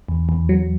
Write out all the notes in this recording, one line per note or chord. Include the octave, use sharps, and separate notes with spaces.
E2
E2
F#3